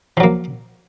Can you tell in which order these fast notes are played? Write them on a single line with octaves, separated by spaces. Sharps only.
F3 F#3 A#3